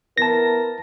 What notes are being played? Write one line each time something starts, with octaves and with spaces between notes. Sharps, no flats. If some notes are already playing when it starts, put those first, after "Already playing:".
B3 E4 A#4 A5 A#6